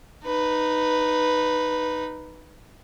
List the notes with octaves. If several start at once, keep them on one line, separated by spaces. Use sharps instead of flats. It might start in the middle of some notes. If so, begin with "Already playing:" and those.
D#4 B4